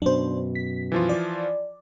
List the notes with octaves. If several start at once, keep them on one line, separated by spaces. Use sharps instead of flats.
F#2 B2 D4 C5
B6
E3 F3 F4
D5